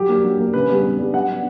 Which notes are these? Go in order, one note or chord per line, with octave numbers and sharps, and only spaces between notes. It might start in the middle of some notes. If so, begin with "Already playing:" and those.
Already playing: F#3 G4
A#3 D4
F#3
A#3 D4
C#3 B4
G3 B3 D4
C#3
G3 B3 D4
F#3 F#5
B3 D4